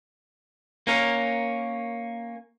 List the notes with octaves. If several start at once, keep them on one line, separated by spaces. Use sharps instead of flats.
A#3 C#4 A#4